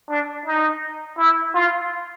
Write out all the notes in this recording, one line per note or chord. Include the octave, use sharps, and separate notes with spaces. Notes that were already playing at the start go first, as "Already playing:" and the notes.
D4
D#4
E4
F4